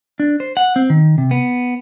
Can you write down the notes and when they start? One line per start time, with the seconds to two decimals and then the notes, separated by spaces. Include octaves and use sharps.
0.20 D4
0.40 C5
0.57 F#5
0.76 C4
0.90 D#3
1.18 C3
1.31 B3